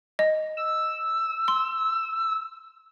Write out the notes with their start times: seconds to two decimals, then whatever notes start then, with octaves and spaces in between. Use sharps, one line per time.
0.19 D#5
0.57 E6
1.48 C6